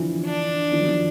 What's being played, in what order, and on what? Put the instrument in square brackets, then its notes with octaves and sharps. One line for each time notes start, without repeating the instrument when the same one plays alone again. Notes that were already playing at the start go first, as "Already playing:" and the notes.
Already playing: [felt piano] D3 E3 F3
[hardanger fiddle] D4
[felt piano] D#3 F3
F#3
D#3 F3